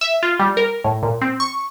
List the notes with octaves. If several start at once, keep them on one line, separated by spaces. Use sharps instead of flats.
E5
F4
G3
A#4
A2
A#2
C4
C#6